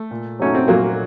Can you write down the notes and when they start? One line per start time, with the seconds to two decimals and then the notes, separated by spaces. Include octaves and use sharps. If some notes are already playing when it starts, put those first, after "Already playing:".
Already playing: A3
0.11 A#2
0.39 F#3 A3 C#4 D#4 F#4
0.55 C4
0.68 A#2 F#3 A#3